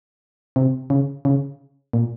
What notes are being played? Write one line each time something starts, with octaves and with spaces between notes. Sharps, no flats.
C3
C#3
C#3
A#2